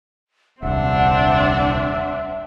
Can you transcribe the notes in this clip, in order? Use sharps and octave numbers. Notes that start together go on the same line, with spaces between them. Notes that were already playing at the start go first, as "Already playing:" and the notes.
D#1 C2 C4 D4 E5 F#5